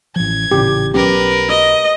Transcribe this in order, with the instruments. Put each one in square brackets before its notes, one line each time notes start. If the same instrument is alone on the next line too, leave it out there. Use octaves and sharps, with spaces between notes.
[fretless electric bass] A1 F3 [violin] G#6
[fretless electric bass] A1 A#2 C#3 [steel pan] G4
[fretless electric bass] B1 F#3 C#4 [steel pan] G4 [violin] A#4 B4
[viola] D#5